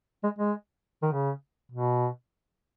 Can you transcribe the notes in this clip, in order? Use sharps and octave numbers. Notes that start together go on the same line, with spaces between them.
G#3
G#3
D#3
C#3
B2